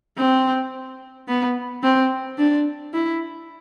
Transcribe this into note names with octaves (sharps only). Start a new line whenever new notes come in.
C4
B3
C4
D4
E4